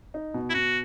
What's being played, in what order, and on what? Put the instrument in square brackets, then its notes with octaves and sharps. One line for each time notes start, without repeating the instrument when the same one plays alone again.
[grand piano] D#4
B2
[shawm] E4
[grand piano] B2 [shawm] F#4